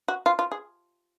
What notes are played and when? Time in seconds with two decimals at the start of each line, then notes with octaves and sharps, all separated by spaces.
0.08 F#4
0.26 F4
0.39 F4
0.52 G#4